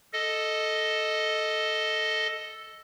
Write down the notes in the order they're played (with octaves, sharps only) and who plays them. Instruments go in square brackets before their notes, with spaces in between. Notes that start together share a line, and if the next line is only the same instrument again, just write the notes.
[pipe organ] A4 D#5